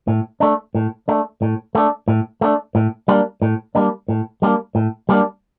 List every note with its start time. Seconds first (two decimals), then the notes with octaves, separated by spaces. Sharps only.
0.08 A2
0.40 A3 D4
0.75 A2
1.08 A3 D4
1.42 A2
1.75 A3 D4
2.08 A2
2.41 A3 D4
2.75 A2
3.08 G3 A#3 D4
3.42 A2
3.75 G3 A#3 D4
4.08 A2
4.42 G3 A#3 D4
4.75 A2
5.09 G3 A#3 D4